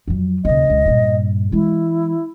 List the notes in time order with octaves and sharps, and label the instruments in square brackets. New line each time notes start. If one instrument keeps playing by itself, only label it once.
[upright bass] F2 F#3
[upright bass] D#2 C#3 [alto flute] D#5
[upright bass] C#2
G2 A#2
[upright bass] E3 G#3 [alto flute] E4